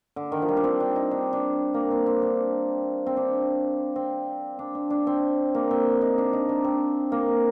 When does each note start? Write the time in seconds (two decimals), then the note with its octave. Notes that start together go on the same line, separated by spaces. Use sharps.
0.16 D3
0.32 D#3
0.42 F3
0.49 G3
0.57 D4
0.64 C4
0.80 D4
0.96 D#4
1.11 D4
1.33 D4
1.74 A#3
1.91 C4
2.06 C4
2.22 D4
3.06 C4
3.17 D4
3.96 C4
4.59 D4
4.75 D4
4.90 D4
5.07 C4
5.55 A#3
5.71 C4
6.01 D#4
6.18 D4
6.33 D#4
6.49 D4
6.64 C4
7.12 A#3